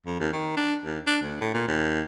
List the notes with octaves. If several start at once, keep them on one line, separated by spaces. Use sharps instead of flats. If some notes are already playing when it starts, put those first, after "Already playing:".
F2
D#2
D#3
D4
D#2
D4
D2
A2
A#2
D#2